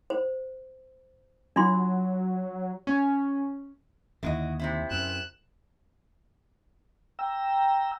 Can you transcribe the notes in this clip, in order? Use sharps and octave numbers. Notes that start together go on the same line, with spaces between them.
C5
F#3 D4 F4 C6
C#4
D#2 D3 E4 F#4 D#5
C3 C4 E4
F#2 F#6 E7
G5 A#5 E6